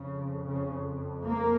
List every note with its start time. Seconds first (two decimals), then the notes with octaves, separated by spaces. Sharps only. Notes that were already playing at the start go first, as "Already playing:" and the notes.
Already playing: F2 C#3
0.46 C#3
1.26 A#3